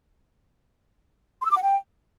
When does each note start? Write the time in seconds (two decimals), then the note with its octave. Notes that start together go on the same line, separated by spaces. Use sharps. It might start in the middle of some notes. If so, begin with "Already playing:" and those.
1.40 C6
1.45 E6
1.51 D6
1.56 F#5
1.61 G5